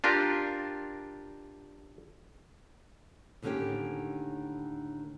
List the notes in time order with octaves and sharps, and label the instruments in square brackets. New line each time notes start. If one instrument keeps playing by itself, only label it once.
[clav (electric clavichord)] D4 F4 G4 A#4
[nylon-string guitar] A2 D3 D#3 A#3 C#4 G4